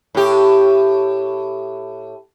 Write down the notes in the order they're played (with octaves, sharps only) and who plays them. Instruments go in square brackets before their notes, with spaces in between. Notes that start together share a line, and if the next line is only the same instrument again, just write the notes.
[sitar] A2 G4